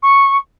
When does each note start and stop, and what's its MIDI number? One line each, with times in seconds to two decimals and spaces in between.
0.02 0.37 85